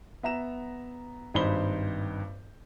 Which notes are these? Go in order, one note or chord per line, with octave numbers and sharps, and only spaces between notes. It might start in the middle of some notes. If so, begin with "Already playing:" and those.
B3 E5 A#5 E7
G#1 G2 D#4 C5 B5 G7